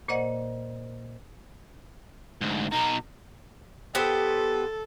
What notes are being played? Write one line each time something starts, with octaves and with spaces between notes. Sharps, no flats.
A#2 A#3 C5 D5 D#5 F#5
D2 G#2
B2 D#4 A#5
B3 G4 A4 C5